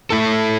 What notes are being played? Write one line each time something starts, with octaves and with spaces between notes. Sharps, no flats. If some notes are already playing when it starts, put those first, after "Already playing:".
A3 E4 A4